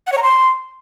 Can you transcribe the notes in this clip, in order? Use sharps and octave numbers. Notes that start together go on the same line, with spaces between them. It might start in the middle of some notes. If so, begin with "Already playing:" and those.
F#5
C#5
A#5
C6